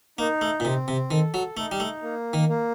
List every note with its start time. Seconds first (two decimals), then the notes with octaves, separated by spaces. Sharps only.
0.18 A#3 D#4
0.41 A3
0.60 A#2
0.65 C3 C4
0.88 C3
1.11 D#3 A4
1.34 F#3
1.57 A3 D#4
1.72 G3
1.80 A3
2.02 A#3
2.33 D#3
2.49 A#3